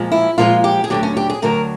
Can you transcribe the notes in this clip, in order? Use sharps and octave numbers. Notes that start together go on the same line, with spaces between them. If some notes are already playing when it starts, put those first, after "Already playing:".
Already playing: A#2 F3 G#3
E4
A#2 F3 G#3 F4
G4
G#4
D2 D3 F#3 G4
C#4
G4
G#4
D2 D3 F#3 A#4